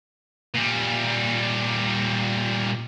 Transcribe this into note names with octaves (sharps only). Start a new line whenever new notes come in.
A#2 G3